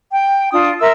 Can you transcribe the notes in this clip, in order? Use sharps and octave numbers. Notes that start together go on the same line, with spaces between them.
G5
D4 F4 D#6
A#4 E5 C6 E6